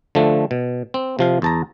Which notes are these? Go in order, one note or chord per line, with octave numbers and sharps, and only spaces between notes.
D3 F3 A3
B2
C4
C3 F3 F5
E2 A5 A#5